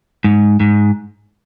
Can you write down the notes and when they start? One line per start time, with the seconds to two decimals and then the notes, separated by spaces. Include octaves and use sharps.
0.24 G#2
0.60 G#2